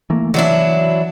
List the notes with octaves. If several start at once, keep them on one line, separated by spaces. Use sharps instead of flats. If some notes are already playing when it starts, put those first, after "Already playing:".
E3 A3 A#3
E3 F#3 D4 E4